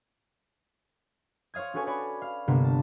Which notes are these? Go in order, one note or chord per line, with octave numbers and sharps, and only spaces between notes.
C5 C#5 F5 D#6 G#6
C#4 F#4 A4 B4 C#5 G#5
C#5 D5 G#5 B5
F5
G1 C3 A#3 B3
A5